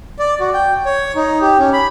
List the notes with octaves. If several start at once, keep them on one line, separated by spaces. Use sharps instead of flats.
D5
F#4
G5
C#5
D#4
G4
C#4
B5